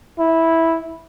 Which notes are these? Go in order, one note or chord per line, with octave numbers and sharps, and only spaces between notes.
E4